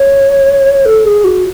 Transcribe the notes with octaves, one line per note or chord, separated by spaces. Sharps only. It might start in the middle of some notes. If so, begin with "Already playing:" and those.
Already playing: C#5
A4
G#4
F#4